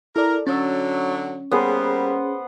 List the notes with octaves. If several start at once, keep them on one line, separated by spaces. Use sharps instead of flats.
E4 A4 A#4 D5
D3 F#3 C#4 E6 A6
G3 A#3 B3 G#4 C5 C#5